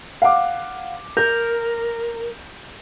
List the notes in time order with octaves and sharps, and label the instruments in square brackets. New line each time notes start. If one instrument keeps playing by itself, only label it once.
[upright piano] F5 F#5 D6
[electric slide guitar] A#4 [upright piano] G6